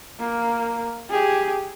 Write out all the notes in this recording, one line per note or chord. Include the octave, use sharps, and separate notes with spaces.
A#3
G4 G#4